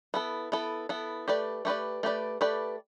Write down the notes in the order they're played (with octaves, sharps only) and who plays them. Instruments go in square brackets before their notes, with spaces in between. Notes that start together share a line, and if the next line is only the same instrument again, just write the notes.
[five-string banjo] B3 E4 A4
B3 E4 A4
B3 E4 A4
A3 G4 B4 D5
A3 G4 B4 D5
A3 G4 B4 D5
A3 G4 B4 D5